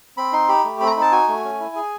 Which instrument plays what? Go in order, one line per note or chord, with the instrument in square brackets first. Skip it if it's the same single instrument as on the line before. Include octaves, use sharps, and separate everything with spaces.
[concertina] C4 B5
D#4 C6
G4 B5
A3
C4 B5
A#5
D#4 B5
A5
F#4 G#5
A3
C#4
E4
G#4